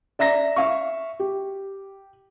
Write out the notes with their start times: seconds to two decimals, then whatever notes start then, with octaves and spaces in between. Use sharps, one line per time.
0.19 D5 E5 A#5 A#6
0.56 E5 F5 C#6
1.19 G4